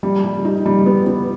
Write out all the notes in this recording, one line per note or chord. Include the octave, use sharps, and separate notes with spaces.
G3
G3
D#4
G3
B3
B3